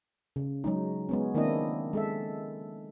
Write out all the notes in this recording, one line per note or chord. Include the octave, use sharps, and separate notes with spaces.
C#3
F#3 G#3 D#4
G#3 B3 C#4
D#3 A#3 C4 D4 E4 D#5
G#3 A4 E5